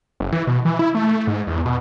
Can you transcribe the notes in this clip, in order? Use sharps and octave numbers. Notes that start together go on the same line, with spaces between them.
F#1
E3
B2
E3
E4
A3
G#2
E2
B2